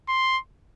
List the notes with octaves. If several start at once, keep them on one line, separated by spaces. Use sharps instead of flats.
C6